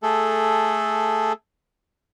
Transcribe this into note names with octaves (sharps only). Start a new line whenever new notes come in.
A3 G#4 A4